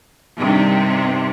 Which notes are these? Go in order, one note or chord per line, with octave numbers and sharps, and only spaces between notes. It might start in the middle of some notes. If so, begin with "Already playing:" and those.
G2 C3 D#3